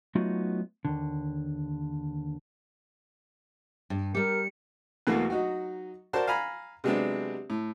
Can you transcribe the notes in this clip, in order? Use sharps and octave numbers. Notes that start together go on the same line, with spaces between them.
F#3 A3 B3 D#4 F4 F#4
D#2 D3
G2
G3 G4 A#4 C#7
E2 B2 E3 F#3 A3 A#3
F#3 D#4 F#4
F#4 A#4 C5 D5 A5
F5 G#5 A#5 B5
C3 F#3 G#3 B3 C4 D4
A2